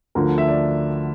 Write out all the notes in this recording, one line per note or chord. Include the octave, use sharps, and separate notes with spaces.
D2 D3 F3 A#4
E5
D5